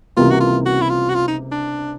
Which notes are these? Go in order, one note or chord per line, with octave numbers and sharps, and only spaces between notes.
C#2 C3 E3 G3 A#3 F4
F#4
F4
F#4
E4
F4
F#4
F4
D#4
D4